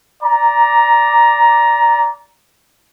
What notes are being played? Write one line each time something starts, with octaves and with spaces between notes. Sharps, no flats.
D5 A#5